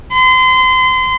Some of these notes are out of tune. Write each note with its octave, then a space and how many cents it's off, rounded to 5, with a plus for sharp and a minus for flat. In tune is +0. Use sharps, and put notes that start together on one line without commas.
C6 -30